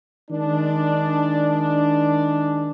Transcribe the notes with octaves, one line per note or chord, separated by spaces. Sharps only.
D#3 G#3 D4